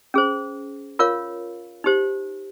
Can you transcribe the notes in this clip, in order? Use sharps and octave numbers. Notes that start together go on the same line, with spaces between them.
C#4 G#4 C5
F4 A#4 C#5 F5
D#4 G4 C5